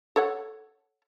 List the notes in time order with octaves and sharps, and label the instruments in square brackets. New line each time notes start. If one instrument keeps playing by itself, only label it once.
[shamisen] A4 C#5 F#5